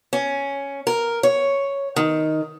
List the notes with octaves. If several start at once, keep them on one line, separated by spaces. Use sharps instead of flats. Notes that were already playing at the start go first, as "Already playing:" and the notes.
C#4
A#4
C#5
D#3